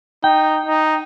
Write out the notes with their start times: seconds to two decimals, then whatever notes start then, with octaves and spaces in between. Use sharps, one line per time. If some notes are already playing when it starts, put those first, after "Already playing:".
0.24 D#4 G5
0.66 D#4